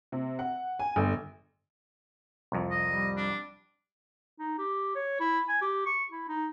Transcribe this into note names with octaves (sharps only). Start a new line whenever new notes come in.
C3
F#5
G#5
G1
C2 F2
D#5
G3
D4
D#4
G4
C#5
E4
G#5
G4
C#6
E4
D#4